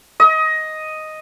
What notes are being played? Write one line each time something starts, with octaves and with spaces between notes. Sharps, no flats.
D#5